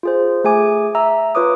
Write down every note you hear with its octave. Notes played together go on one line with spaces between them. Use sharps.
F4 G#4 C5
A3 G#4 G#5 D6
E5 A#5 E6
F4 B4 C#5 D6 D#6